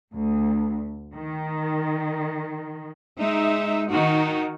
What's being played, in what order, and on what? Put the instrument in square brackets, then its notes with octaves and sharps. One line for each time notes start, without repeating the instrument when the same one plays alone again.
[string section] D2
D#3
[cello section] G#3 D#4 E5
D#3 D#4 F#4